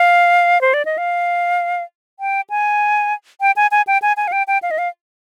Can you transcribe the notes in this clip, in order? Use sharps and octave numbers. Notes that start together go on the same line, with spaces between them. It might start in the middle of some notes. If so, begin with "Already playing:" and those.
Already playing: F5
C5
D5
D#5
F5
G5
G#5
G5
G#5
G#5
G5
G#5
G#5
F5
G5
G5
F5
D#5
F5